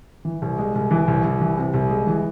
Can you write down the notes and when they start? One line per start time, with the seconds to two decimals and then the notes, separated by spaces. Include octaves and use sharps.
0.25 E3
0.42 C2
0.59 G#3
0.75 C2
0.91 E3
1.08 C2
1.24 C2
1.41 E3
1.57 C3
1.74 C2
1.90 G#3
2.07 E3